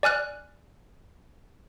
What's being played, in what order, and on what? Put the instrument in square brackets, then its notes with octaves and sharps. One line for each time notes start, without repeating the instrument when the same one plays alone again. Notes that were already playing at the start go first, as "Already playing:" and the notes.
[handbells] D5 G#5 F6 F#6